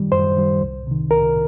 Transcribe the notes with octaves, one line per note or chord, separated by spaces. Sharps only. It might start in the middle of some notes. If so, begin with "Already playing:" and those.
Already playing: F#2 D#3 G3
F#2 C5
D#3 G3
C2
C3 D#3
C2 A#4